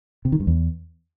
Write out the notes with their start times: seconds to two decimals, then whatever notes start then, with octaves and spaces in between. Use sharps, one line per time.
0.25 C3
0.32 D#3
0.40 G2
0.47 E2